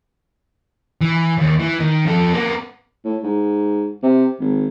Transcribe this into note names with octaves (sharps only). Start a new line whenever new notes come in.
E3
D#2
E3
D#3
F3 A4
A#3 B3
A2
G#2
C3
G#1